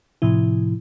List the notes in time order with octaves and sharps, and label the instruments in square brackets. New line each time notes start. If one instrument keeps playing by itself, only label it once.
[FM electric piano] A2 C3 F3 E4